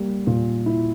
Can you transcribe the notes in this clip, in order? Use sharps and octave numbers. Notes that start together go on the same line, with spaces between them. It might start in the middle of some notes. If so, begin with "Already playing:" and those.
Already playing: G3 A#3
A#2
E4